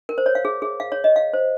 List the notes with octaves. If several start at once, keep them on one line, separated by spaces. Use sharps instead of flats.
A#4
C5
C#5
F5
G#4
G#4
F5
C#5
D#5
F5
C5